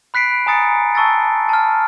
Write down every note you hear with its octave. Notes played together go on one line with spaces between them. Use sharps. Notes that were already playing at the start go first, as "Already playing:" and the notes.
B5 F#6 B6 C7 D7
G#5 A#5 D#6 A6 C#7
A5 C#6 E6 A6
A5 F6